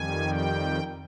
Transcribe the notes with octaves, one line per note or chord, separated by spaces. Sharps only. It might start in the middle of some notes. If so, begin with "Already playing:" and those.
Already playing: F2 D#3 G3 G#5
G5